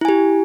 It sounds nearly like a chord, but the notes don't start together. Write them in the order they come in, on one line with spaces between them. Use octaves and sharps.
E4 G#5 G4